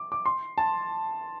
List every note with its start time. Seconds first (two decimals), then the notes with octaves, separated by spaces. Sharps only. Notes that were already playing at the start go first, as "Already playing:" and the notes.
Already playing: D6
0.12 D6
0.26 C6
0.58 A5